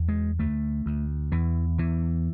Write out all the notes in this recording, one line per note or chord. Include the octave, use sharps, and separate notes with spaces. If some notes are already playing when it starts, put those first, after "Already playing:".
Already playing: E2
G#3
D2 A3
D2
E2 E3
E2 E3